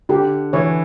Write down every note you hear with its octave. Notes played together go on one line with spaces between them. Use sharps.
D3 G4
E3 C#5